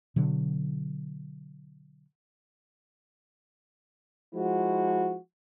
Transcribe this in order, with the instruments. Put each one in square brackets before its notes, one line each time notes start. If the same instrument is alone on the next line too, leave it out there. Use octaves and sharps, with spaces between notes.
[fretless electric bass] B2 D3 F#3
[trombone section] F3 G#3 E4 F#4